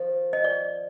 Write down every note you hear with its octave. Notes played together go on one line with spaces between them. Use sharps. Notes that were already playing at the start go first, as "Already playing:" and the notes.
Already playing: D#3 F3
D#5
D5